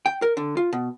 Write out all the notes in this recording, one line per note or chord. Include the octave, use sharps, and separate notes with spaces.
G5
A#4
D3
F4
B2